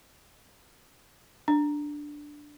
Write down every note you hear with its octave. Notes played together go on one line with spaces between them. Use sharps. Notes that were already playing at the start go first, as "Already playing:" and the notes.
D4